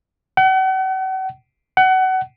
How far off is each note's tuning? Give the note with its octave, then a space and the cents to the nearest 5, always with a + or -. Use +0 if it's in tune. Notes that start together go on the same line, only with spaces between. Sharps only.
F#5 +40
F#5 +25